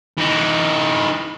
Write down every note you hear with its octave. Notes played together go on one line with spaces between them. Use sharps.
E3 D#4